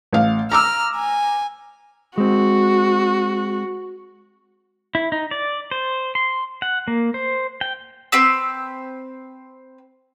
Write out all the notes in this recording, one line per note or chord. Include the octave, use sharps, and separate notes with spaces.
A1 F5
A#5 D6 E6 F6
G#5
G#3 C4 F#4
E4
D#4
D5
C5
C6
F#5
A#3
C5
G5
C4 B4 E6